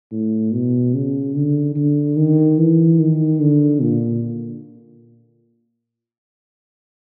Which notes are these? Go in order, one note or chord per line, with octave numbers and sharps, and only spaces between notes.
A2
B2
C#3
D3
D3
D#3
E3
D#3
D3
A#2